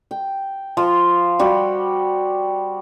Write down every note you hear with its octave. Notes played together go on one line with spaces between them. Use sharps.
G5
F3 F4
G3 F#4 G4